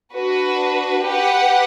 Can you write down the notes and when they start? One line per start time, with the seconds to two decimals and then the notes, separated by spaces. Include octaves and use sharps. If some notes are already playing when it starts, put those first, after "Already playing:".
0.13 D4 F#4 B4
1.04 G4 B4 F#5